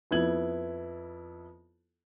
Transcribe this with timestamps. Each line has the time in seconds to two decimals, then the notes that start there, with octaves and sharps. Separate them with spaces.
0.11 F2 B3 E4 G#6 F#7